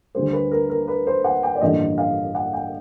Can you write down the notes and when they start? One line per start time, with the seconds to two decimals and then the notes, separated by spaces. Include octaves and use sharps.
0.15 D2 D3 G3 C5
0.33 B4
0.52 A#4
0.70 A#4
0.88 B4
1.07 C5
1.24 F#5
1.43 G5
1.55 D5
1.61 A1 G2 D3 F3 A#3 D#5
1.98 F5
2.35 F#5
2.53 G5